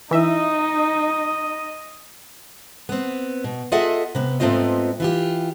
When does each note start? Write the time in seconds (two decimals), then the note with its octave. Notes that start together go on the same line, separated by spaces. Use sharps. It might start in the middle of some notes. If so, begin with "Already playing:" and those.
0.11 E3 D#4 D#5 E5
2.89 B3 C4
3.44 B2
3.72 F4 G#4 A4 D#5 E5 F#5
4.15 C3 B3
4.40 G#2 A3 B3 C4 F4 D#5
5.00 E3 F4 G4